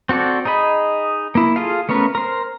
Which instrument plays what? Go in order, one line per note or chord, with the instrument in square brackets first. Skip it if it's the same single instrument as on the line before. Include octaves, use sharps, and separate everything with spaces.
[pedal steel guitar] C4 F#4 A4 D5
D#4 G#4 D#5 B5
A#3 E4
F4 G#4 A4 F5
A3 B3 C#4 A#4 B4
A#4 C5